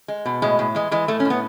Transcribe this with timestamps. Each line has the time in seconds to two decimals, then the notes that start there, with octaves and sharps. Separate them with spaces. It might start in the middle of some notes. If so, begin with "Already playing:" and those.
0.08 G#3
0.25 B2
0.42 A2 G#3
0.59 A2
0.75 E3 G#3
0.91 E3 G#3
1.08 A2 A3
1.20 C#4
1.25 A2
1.30 B3